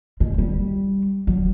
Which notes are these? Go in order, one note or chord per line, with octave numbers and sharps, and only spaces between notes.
G#3
G3
F#3